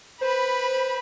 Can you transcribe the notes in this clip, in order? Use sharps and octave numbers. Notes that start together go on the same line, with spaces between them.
B4 C5 B5